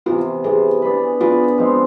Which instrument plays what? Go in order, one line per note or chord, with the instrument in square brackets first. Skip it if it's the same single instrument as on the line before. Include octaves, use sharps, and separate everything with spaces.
[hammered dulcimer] C3 E3 B3 [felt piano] F4
[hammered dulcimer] C3 E3 B3 [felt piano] G#4
[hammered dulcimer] B3 D4 G#4 B4
[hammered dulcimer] B3 D4 G#4 B4 [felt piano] F4
[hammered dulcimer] F3 G#3 C4